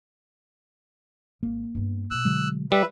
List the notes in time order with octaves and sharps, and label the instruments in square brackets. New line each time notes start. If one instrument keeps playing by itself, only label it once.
[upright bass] G#1 [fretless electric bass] A#3
[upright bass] G2 B3
[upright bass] B2 A3 [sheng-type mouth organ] E6 F#6
[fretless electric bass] D3 F#3 G#3
[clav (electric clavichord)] G3 [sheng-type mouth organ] B4 E5